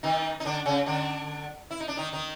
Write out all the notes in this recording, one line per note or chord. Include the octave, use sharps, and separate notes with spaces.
D#3 D#4
D#4
D3 D4
C#3 C#4
D3 D4
E4
D#4
D4
D#3 D#4
D#3 D#4